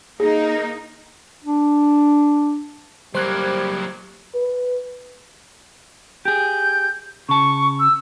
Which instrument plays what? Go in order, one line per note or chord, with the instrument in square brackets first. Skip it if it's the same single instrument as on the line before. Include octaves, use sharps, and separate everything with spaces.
[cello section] A#3 D#4 [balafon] G#4
[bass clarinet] D4
[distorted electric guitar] F#3 A#3 [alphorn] G3 [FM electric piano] C5 F#6 G#6
[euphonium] B4
[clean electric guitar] G4 G#4 [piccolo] G6
[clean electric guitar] C#3 A5 [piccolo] C#6
[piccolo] E6